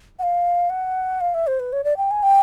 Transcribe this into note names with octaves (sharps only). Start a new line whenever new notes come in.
F#5
F5
F#5
F5
E5
C5
B4
C#5
D5
G5
G#5
G5